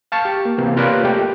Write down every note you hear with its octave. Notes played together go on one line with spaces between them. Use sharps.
F5 A5 C#6
G4
A#3
C3 E3 A#3 B3
F4 G4 A#4 B4 C#5 D5
A3 G4